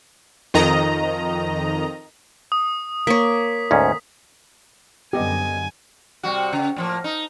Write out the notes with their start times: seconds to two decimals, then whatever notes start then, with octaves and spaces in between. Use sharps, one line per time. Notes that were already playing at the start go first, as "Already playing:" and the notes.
0.54 F2 D#3 D#5 A#5
2.52 D#6
3.07 A#3 C#5 B6
3.71 D2 G#2 C#4
5.13 F#2 D3 G3 B3 G4 D#5 G#5
6.23 C3 G3 F#4
6.53 C#3
6.76 A2 F3 A#3
7.04 D#4